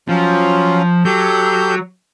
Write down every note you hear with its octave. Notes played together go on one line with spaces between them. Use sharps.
F3 F#3 C#4 F4
F#3 G4 A4 G6